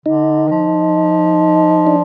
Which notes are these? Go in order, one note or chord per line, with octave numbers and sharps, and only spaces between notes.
D3 D#4
D#3
F3
D4